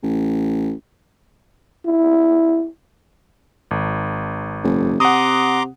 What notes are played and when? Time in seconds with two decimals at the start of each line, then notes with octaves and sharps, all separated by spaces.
0.03 A1
1.86 E4
3.71 G#1
4.63 F#1
5.00 C3 F#5 A#5 C6 D6 D#6